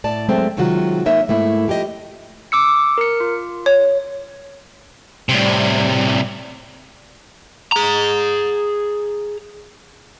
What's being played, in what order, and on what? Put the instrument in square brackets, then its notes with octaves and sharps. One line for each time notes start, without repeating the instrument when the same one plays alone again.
[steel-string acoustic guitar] A2 D5 A5
F#3 G#3 A3 C4
C3 D#3 F#3 G#3 F4 F#4
G#2 A#3 D#4 A#4 C#5 E5
G#2 A3 A#3 E4
F3 G4 G#4 D#5 E5
[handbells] D6 E6 C#7
A#4 C#7
F4
[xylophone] C#5
[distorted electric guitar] A2 C3 [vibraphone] G3 C4 D5
[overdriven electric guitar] G#4 A#5